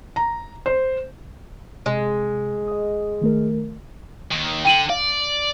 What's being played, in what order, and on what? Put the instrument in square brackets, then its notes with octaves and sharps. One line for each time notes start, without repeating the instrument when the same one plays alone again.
[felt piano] A#5
C5
[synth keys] C3 [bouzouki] G#3
[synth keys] D#5 D#6
D#3 A3 A#4
[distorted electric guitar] D#2 D#3
[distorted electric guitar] D3 [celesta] G5 D#7 F#7
[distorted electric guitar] D5 [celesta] F5